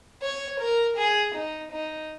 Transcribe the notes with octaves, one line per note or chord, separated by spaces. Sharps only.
C#5
A#4
G#4
D#4
D#4